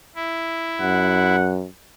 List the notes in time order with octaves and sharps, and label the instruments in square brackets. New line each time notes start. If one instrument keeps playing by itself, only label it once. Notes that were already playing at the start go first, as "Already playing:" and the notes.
[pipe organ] E4
[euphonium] F#2 [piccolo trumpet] F#5